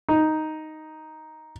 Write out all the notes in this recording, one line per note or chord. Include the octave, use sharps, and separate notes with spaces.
D#4